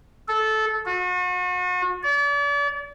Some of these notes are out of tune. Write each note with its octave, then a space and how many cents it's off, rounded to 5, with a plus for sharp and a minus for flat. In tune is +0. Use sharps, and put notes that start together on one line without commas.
A4 -15
F#4 -40
D5 -40